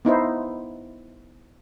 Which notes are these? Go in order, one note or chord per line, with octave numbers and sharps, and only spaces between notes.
B3 D#4 E4 C5